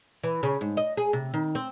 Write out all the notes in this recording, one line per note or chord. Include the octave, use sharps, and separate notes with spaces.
E3
C#3
G#2
D#5
G#4
C3
D#3
C4